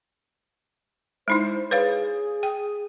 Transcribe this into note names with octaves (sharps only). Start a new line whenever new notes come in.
G#3 D#4 E4 C5
G#4 B4 C#5 F5
G5